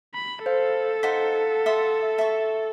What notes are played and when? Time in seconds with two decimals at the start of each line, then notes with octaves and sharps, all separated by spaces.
0.15 B5
0.46 A4 C5 F5
1.03 D#4 C5 F5 F#5 B6
1.66 E5 C6 D#6
2.18 E5 A5 C#6